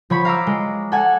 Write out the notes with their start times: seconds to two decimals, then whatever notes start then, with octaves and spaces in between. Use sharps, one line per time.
0.10 F3 C#5 B5
0.25 F5 A#5 D6 E6
0.47 G#3
0.92 A4 F#5 G#5